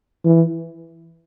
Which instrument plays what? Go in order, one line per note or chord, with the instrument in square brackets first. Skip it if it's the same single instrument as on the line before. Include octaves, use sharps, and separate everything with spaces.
[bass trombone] E3